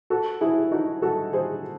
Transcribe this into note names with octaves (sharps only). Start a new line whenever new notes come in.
F#4 A4
E4 G#4
D#4 F#4
F#4 A4
G#4 C5